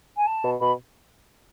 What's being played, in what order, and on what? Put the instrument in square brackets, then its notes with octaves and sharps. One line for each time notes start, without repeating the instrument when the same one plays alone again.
[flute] G#5
A5
[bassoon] B2
[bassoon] B2 [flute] B5